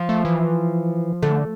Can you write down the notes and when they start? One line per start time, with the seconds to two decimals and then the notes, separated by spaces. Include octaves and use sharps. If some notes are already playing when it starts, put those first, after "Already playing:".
Already playing: F3
0.09 A3
0.25 E3
1.23 D3 A3